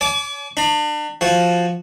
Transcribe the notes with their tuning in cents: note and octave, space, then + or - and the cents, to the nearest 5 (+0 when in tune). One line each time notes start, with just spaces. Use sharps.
C#5 +35 G#5 +45 D6 -20
D4 +35 B5 -35
F3 +0 F#4 +0